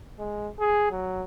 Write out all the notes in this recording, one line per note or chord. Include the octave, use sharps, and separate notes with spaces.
G#3
G#4
F#3